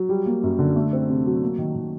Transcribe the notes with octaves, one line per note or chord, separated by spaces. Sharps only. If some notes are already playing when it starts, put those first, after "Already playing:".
Already playing: F#3
G3
A#3
F#2
D3
A3
C4
C3
F#3
A#3
D#3
D#3